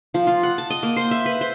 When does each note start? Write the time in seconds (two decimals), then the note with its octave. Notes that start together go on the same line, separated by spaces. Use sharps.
0.14 F3
0.27 F4
0.43 F#5
0.58 A5
0.70 D#5
0.83 A#3
0.96 C5
1.11 E5
1.26 B4
1.41 C5